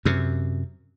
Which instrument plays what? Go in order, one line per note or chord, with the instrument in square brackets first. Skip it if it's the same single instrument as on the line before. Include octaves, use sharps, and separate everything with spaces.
[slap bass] F#2 C3